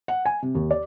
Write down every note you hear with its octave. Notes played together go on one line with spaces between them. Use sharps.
F#5
G#5
C3
D#2
D5